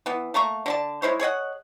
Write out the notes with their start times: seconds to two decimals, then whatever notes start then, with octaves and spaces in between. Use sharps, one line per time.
0.06 E3 B3
0.34 A3 A#3 A#5 C#6
0.66 D3 D5 A5
1.02 G#3 E4 C5 C#5
1.20 G#4 C#5 D#5 F#5